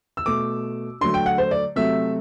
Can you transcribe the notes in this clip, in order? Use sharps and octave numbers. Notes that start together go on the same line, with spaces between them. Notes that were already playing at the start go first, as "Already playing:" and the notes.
E6
B2 A3 D6
D3 F#3 A3 C6
G5
F#5
C5
D5
C3 F#3 A3 E5